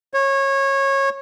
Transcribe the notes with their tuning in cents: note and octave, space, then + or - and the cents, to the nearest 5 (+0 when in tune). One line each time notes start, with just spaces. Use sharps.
C#5 -20